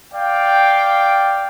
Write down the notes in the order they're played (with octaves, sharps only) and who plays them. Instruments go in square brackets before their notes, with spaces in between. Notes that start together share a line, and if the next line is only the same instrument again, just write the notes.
[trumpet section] D5 F5 G5